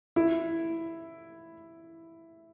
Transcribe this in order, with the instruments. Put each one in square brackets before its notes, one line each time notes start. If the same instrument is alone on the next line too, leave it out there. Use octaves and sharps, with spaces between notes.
[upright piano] E4